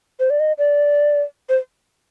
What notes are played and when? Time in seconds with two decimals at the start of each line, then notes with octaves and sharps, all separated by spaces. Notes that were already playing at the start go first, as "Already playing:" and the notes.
0.20 C5
0.30 D5
0.40 D#5
0.58 D5
1.49 C5